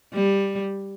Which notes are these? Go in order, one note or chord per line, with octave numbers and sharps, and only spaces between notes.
G3